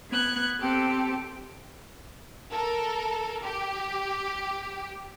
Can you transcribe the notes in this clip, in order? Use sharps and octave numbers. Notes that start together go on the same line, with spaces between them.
B3 F#6 G#6
C4 G4 A4
A4 A#4
G4